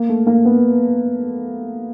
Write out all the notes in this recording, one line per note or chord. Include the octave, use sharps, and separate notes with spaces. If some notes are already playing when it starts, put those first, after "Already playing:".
Already playing: A#3
A3
A#3
B3